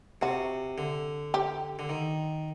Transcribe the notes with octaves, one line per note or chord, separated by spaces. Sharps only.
C3 F#4
D3
G4
D3
D#3